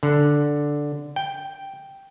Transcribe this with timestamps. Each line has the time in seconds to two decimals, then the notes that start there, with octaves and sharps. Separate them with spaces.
0.03 D3
1.16 G5